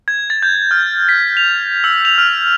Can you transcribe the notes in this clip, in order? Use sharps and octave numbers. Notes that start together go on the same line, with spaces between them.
G#6
A6
G6
F6
B6
F7
E6
F7
F6